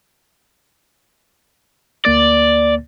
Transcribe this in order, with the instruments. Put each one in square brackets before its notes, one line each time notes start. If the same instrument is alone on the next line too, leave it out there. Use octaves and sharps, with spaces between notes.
[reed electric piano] D2 A#3 A6 [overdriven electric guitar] D5